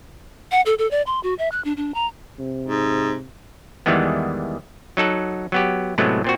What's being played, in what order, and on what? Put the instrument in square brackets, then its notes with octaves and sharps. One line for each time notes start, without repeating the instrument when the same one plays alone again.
[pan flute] F#5
A4
A4
D5
C6
F#4
E5
F#6
D4
D4
A#5
[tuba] C3
[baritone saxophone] G#2
[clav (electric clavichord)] E2 D#3 E3 G3 G#3 B3
F#3 D#4 A4 F#5
F#3 B3 G4
A2 C3 F#3 G#3 A3 B3
A#2 C4 F#4